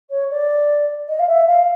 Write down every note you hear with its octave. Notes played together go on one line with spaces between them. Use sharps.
C#5
D5
D#5
F5
E5
F5